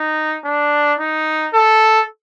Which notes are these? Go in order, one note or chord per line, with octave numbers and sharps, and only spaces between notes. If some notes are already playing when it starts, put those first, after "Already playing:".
Already playing: D#4
D4
D#4
A4